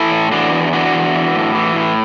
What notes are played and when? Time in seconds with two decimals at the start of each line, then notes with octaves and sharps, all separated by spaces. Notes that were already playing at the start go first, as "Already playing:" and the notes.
Already playing: E3 E4 A4
0.12 A2
0.31 E3 D4 F#4
0.53 E2
0.73 E3 D4 F#4
0.94 E2
1.15 E3
1.35 A2
1.55 E3
1.76 A2